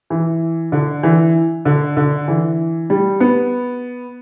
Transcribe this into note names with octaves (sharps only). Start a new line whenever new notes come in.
E3
D3
E3
D3
D3
E3
G3
B3